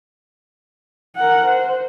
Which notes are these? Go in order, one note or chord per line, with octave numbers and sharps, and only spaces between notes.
A#4 F#5
C5